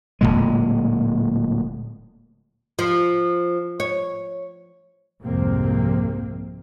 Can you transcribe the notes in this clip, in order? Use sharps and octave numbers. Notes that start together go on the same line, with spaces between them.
D1 C#2 A#2 G#3
F3
C#5
C2 F2 G#2 C3 A#3 C4